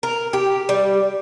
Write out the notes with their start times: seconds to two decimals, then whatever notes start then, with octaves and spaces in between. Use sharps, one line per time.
0.03 A#4
0.33 G4
0.69 G3